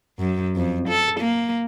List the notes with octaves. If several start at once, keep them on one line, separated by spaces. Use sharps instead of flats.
F#2
F2
A4
A#3